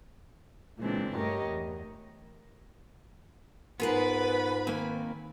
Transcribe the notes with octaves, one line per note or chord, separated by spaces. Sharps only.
A#2 C#3 E3 G#3 C4 D4
G2 A3 G4 A#4 C#5 D#5
E2
G#2 B3 F4 G#4 A#4 B4 F#5 B5
D#3 A#3 C4 G#5